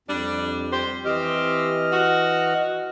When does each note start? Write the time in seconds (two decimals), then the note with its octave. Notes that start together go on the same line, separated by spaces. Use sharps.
0.08 F2 G3 D4
0.71 G4 C5
1.05 E3 C4 G4 D#5 F6
1.92 F#4